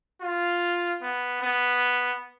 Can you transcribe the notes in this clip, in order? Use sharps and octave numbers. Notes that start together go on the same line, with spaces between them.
F4
B3
B3